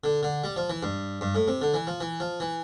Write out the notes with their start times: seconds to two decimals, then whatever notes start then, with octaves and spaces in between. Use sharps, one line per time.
0.04 D3
0.23 D3
0.44 G3
0.56 F3
0.70 E3
0.83 G2
1.21 G2
1.35 A2
1.48 C3
1.62 D3
1.74 E3
1.87 F3
2.01 E3
2.20 F3
2.40 E3